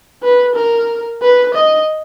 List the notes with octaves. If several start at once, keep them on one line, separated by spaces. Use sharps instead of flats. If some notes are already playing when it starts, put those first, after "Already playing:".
B4
A#4
B4
D#5